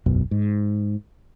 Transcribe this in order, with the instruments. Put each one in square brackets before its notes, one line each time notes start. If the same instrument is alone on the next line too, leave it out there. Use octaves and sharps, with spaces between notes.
[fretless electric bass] E1 B1 F#2 B2
G#2